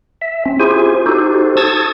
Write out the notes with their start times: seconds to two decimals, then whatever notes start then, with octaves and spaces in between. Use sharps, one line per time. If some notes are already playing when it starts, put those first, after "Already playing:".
0.21 E5
0.46 C4 C#4
0.60 E4 F4 G4 G#4 C5 G#5
1.06 D#4 F#4 G4 A4 C5
1.57 A5 C#6 D#6 E6 G#6 A6